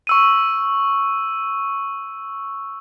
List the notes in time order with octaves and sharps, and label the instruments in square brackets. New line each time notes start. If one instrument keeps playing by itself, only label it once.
[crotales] C#6 E6 D#7